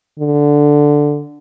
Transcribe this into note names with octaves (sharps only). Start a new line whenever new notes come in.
D3